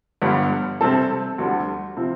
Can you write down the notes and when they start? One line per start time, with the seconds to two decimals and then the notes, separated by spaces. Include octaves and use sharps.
0.22 G1 G2 D3 G3
0.81 C3 G3 C4 A4
1.38 D2 D3 G3
1.97 C3 F3 C4